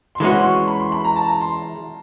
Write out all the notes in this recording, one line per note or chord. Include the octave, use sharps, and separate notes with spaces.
C6
E3 G#3 C#4 F#4 B5
C6
C#6
C6
B5
C6
B5
A#5
A5
A#5
C6